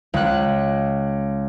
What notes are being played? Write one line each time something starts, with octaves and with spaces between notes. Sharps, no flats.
C#2 F#6